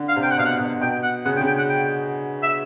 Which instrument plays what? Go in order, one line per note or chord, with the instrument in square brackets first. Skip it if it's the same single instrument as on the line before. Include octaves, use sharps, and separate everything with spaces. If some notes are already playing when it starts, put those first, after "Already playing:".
Already playing: [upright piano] D3
[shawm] F5
[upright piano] C3
[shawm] G5
F#5
[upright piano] B2 [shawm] F5
[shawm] F#5
[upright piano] B2
[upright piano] B2 [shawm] G5
[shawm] F#5
[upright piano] C#3 [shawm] F#5
[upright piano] D3
[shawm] G5
[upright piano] C#3
[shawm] G5
F#5
G5
E5